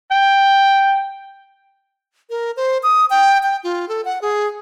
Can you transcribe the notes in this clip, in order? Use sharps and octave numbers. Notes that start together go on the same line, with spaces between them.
G5
A#4
C5
D#6
G5
G5
F4
A4
F#5
G#4